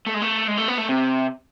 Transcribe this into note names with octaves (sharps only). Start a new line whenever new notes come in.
A3
G#3
A3
G#3
A3
B3
A3
C3